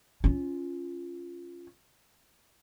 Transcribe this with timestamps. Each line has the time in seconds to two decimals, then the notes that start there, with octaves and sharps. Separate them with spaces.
0.24 C#4 F4